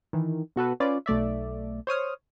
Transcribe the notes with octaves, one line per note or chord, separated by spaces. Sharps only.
D#3 E3
B2 F#4 A4 B4
C#4 F4 B4 D5
B1 A3 D5 E5
C5 C#5 D#6 F6